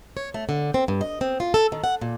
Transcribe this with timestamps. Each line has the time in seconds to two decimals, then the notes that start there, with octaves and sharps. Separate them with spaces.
0.17 C#5
0.34 A3
0.49 D3
0.74 C4
0.88 G2
1.01 D#5
1.21 C4
1.40 F4
1.54 A4
1.72 D#3
1.84 F#5
2.01 A#2